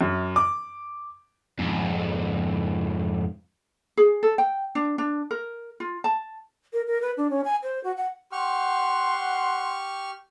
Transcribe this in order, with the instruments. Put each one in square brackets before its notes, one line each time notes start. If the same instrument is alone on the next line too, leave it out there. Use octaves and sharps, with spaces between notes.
[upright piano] F#2
D6
[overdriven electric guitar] F2 G#2
[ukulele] G#4
A4
G5
D4
D4
A#4
F4
A5
[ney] A#4
A#4
B4
D4
C#4
G#5
C5
F#4
F#5
[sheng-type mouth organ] G4 C#6 F6 [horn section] F#5 C6